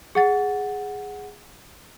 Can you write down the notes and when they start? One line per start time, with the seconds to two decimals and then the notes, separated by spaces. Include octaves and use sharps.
0.15 G#4 F#5 A6